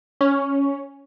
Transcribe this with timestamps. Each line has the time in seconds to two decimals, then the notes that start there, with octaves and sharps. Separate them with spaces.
0.21 C#4